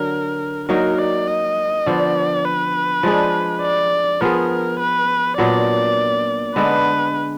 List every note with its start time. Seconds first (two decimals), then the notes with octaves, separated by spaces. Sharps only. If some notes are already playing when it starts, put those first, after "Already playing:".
Already playing: D3 F#3 A#4
0.69 F#3 A#3 D#4 F#4 A#4
0.98 D5
1.27 D#5
1.86 D3 F3 B3 D5
2.45 B4
3.03 F3 G#3 D4 G#4
3.62 D5
4.21 F3 B3 F4 G#4 A#4
4.80 B4
5.38 A#2 F#3 B3 D4 D5
6.56 D3 G#3 B3 D4 B4